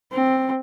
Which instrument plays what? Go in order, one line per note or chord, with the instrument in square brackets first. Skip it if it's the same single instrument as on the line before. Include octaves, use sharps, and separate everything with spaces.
[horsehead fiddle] C4